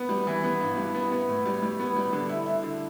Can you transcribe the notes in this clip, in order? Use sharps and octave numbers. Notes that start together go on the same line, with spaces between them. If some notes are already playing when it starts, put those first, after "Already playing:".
Already playing: B3
G3
E3
B3
G2
G3
B3
B3
A2
G3
G3
B3
G3
D3
E4
E4
D3